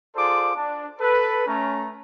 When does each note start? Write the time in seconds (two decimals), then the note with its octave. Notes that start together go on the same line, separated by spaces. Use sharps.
0.16 F4 G#4 A4 C5 D5 D6
0.55 D4
1.00 A4 B4
1.47 A3 C#4 A#5